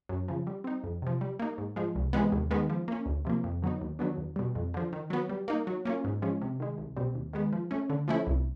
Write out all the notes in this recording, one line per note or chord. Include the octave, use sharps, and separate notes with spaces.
F#2
C#3 F3
G3
C4 D#4
F2
C3 F3
G3
A#3 D#4
G#2
F3 G#3
C2
C3 E3 G#3 B3
D#2
D#3 G#3 B3
F3
A#3 C#4
D2
C3 F3 A#3
F2
D3 F#3 B3 D#4
D#2
D#3 F#3 B3 D4
E2
B2 G3
F2
D3 F3
D#3
F#3 B3
G3
A#3 D#4
F#3
A#3 C#4 F4
G#2
F3 G#3 C#4
C3
D#3 G#3
C2
B2 G3 C4
D#2
D#3 G#3 B3
F3
A3 C#4
D3
F3 A3 C#4 E4
C2